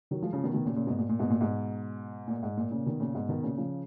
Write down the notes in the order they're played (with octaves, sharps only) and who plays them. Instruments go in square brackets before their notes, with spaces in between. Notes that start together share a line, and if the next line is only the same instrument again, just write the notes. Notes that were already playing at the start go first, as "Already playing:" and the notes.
[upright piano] D#3 F#3
F3 G#3
C#3 F3
B2 D#3
B2 D#3
A#2 C#3
A#2 C#3
G#2 B2
A#2
A#2
G#2 B2
A#2
G#2 B2
A#2
G#2
A#2
A#2 C#3
B2 D#3
A#2 C#3
G#2 B2
B2 D#3
A#2 C#3
C#3 F3